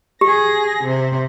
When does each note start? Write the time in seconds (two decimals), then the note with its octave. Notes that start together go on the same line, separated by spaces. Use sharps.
0.21 G4 G#4 A#6
0.84 C3 C5